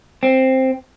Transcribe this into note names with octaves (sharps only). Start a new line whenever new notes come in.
C4